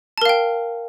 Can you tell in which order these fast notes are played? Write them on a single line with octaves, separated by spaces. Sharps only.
A5 A#4 F5 G5